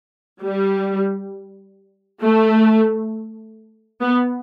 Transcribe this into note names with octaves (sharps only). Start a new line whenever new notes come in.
G3
A3
B3